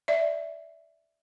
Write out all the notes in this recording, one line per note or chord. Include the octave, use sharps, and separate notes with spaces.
D5 E5